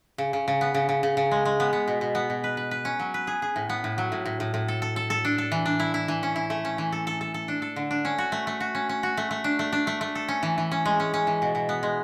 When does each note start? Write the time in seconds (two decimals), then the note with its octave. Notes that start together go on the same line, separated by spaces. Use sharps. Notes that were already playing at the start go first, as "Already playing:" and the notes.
0.18 C#3
0.33 C#3
0.48 C#3
0.61 B3
0.74 C#3
0.89 C#3
1.03 C#3
1.17 C#3
1.31 G#3
1.45 G#3
1.60 B3
1.73 B3
1.88 B2
2.01 B2
2.15 B3
2.30 B2
2.44 B4
2.57 B4
2.71 B4
2.85 C#4
2.99 F#3
3.14 B4
3.27 G#4
3.42 G#4
3.56 A2
3.69 B3
3.84 A2
3.98 F#3
4.12 A2
4.25 A2
4.40 A2
4.54 A2
4.68 A4
4.82 A4
4.96 A4
5.10 A4
5.25 D4
5.38 A4
5.52 E3
5.65 D4
5.80 E4
5.94 E4
6.08 E3
6.23 C#4
6.36 E4
6.50 A3
6.65 C#4
6.78 E3
6.92 A4
7.07 A4
7.21 A4
7.34 A4
7.48 D4
7.62 A4
7.76 D3
7.91 D4
8.05 C#4
8.18 F#4
8.32 A3
8.47 A3
8.60 F#4
8.75 C#4
8.89 C#4
9.03 F#4
9.17 A3
9.31 A3
9.44 D4
9.59 A3
9.72 D4
9.87 A3
10.01 A3
10.15 A4
10.28 C#4
10.43 E3
10.58 E3
10.71 C#4
10.85 G#3
11.00 C#4
11.14 C#4
11.27 E3
11.42 B2
11.55 B2
11.69 B3
11.83 G#3